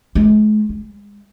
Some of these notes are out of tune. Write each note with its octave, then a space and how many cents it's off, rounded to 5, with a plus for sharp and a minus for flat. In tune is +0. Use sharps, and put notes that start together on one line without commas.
G#3 +45
G#3 -30